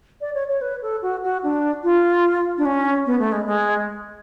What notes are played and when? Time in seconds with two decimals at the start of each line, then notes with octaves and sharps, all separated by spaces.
0.21 D5
0.34 C#5
0.48 C#5
0.61 B4
0.82 A4
1.02 F#4
1.23 F#4
1.43 D4
1.83 F4
2.57 D4
2.65 C#4
3.06 B3
3.19 A3
3.32 G#3
3.45 G#3